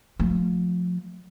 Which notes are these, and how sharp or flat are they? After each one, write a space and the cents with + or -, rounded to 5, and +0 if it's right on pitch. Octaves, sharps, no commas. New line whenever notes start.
F3 +30 A3 +0